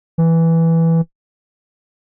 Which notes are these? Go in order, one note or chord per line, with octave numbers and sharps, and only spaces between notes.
E3